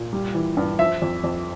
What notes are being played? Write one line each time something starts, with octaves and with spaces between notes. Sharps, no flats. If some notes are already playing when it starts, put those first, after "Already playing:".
Already playing: A#2
G3
E3
G2
F3 E5
F2
F2